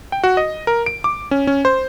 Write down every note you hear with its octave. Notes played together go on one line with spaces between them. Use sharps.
G5
F#4
D#5
A#4
D7
D6
C#4
C#4
C5